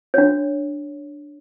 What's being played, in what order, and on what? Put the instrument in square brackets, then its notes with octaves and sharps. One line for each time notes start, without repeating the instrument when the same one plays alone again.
[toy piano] D4 C#5